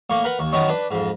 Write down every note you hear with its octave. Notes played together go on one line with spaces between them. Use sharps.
A2 A#3 C#6
A#4 B4 F#5 A#5 B5
D#2 C#6
F#2 D#3 B3 C#5 D#5 C#6
D4 B4
F2 G#2